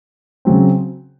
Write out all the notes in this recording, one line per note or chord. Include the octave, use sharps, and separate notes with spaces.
C#3 F#3 C4